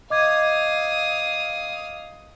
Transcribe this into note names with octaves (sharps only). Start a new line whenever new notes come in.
D#5 F5 D6 D#6 G#6